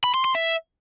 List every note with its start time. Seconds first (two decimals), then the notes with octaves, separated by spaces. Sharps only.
0.04 B5
0.14 C6
0.25 C6
0.35 E5